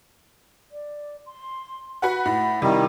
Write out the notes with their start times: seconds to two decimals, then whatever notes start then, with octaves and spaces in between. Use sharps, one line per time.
0.71 D5
1.25 C6
2.02 F#4 B4 F#5
2.25 A2 F#5
2.62 C3 D#3 G3 E4